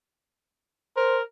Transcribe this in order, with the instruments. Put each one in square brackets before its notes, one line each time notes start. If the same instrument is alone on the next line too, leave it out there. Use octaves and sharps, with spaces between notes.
[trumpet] A#4 [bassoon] C5